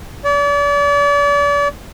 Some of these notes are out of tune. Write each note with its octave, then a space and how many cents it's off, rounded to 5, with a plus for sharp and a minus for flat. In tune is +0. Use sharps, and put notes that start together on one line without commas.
D5 -40